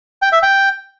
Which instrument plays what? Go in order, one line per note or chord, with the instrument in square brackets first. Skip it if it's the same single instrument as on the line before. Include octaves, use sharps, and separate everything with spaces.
[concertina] G5
E5
G5